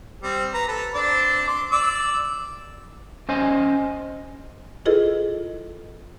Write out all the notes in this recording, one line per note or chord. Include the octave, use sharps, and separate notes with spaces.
G3 C4
B4 A#5
A4 B4
C4 D4 D5
C6 D6
D5 D6 E6
C#4 C5 D#5 G#5
E4 F4 G#4 A4 B4 D#5